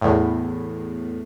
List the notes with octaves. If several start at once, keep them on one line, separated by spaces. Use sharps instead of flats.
E2 A2